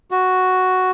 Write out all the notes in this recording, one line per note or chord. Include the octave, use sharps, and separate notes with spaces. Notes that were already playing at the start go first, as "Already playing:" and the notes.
F#4